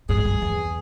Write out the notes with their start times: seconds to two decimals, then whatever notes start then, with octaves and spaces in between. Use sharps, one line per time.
0.09 G#2 G#4
0.25 G2
0.42 E2